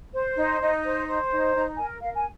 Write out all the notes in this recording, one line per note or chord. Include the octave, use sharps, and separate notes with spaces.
C5
D#4
D#4
C5
C5
D#4
D#4 A#5
A#4 G#5
A#4 F5
G#5